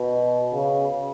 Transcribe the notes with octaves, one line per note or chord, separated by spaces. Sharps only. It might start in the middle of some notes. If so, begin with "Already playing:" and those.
Already playing: B2
C#3